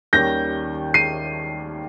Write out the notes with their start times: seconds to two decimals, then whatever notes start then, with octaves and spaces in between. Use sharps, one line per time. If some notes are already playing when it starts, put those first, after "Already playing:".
0.13 D#2 D#3 G3 C#4 G6 A#6
0.94 C7 D#7